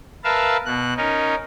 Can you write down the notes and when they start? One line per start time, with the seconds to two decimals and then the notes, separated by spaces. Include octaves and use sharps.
0.24 A#4 B4 E5 F5 A5
0.66 B2 F#6
0.97 C#4 D#4 A#4